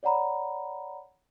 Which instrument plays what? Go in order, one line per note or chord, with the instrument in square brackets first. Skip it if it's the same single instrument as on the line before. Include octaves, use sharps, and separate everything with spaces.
[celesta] C#5 D5 F#5 A#5 B5